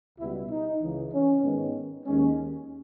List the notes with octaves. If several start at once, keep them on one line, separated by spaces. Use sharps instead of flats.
C#2 B2 G3 B3 E4
D#4
C#2 C#3 E3
C#4
G#2 D#3 G#3 B3
D#2 D#3 G#3 C#4